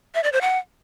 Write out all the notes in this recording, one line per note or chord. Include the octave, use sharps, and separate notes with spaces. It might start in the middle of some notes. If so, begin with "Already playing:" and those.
E5
D5
C5
F#5